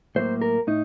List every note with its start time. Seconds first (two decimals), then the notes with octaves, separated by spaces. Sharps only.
0.16 A2 F#3 A#3 C5
0.42 A#4
0.67 A2 D#4